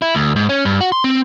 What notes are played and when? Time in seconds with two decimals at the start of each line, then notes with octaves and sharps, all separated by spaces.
0.02 E4
0.15 D2
0.36 G#2
0.49 C#4
0.65 G2
0.81 F#4
0.92 C6
1.04 C4